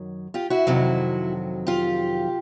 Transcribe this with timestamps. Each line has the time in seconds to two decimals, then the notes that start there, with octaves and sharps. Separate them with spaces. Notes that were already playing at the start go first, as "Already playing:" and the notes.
Already playing: F#2 D#3 F#3
0.34 F4 G4
0.50 E4 F#4
0.67 F2 C3 D#3 F#3
1.67 F4 G4